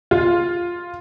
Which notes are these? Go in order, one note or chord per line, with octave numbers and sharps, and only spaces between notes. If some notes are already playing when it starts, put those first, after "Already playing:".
F4